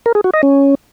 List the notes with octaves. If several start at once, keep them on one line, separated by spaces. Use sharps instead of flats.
A#4
G#4
F#4
D#5
C#4